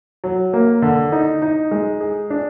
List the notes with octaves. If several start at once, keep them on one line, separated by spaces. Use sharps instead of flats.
F#3
A#3
D3
D#4
D#4
G#3
G#4
D4